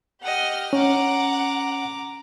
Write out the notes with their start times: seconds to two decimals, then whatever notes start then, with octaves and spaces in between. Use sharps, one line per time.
0.22 G4 D#5 F#5 F6
0.73 C#4 F#5 A#5 D6